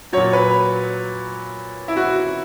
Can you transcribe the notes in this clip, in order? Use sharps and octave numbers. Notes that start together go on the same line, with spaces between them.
A#2 F#3 C#5
B4
E4
F#4